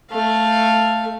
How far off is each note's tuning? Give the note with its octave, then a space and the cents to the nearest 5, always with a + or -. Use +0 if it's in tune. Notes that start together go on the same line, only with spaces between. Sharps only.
A3 +5 F5 +0